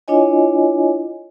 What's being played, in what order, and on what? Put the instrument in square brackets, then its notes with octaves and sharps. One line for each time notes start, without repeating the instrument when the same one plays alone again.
[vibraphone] D4 E4 F4 C#5 D#5 G#5